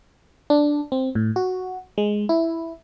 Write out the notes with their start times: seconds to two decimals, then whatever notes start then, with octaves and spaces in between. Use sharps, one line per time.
0.50 D4
0.92 C4
1.15 A2
1.36 F#4
1.98 G#3
2.29 E4